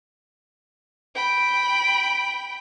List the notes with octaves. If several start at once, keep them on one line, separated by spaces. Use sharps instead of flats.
G5 B5